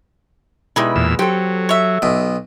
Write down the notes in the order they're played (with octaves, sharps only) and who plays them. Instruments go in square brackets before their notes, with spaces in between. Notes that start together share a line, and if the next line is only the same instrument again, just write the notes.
[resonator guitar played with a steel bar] B2 G#3 B4 [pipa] G3 D#4 E4
[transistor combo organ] E2 A#2 E6
[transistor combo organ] F#3 [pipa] C4 [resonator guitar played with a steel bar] G4 A4
[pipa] C#5 E5
[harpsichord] B1 B2